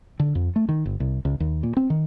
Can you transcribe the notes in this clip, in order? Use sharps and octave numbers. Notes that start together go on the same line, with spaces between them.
D3
F2
A3
D#3
G1
C2
C#2
D#2
A#2
C4
D#3